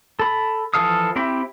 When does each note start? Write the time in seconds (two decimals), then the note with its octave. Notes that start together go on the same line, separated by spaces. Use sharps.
0.19 A4 B5
0.74 E3 F3 A4 F5 D#6
1.16 C4 E4 G4 E5 B5